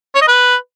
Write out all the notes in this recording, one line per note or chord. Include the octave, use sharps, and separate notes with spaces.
C#5
D#5
B4